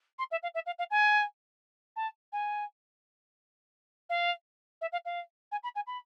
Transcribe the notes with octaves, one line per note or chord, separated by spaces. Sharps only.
C6
E5
F5
E5
F5
F5
G#5
A5
G#5
F5
E5
F5
F5
G#5
B5
G#5
B5